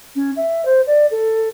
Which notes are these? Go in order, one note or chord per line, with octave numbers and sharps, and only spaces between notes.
C#4
E5
C5
D5
A4